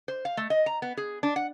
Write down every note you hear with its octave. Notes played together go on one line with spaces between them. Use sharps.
C5
F5
A3
D#5
A#5
B3
G#4
D4
F#5